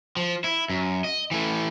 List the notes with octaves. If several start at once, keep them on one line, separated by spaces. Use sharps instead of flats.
F3
E4
F#2
D#5
E3 A3